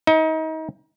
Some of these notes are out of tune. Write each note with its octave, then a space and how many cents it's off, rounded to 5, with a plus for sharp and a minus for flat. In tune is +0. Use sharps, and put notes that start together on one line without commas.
D#4 +30 D#5 +35